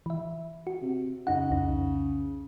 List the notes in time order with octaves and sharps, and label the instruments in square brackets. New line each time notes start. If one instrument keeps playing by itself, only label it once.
[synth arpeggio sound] E3 E5
F#4
[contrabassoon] C3
[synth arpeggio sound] F#2 D#4 F#5 [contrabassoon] C#3
[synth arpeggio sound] C2 F2 D#4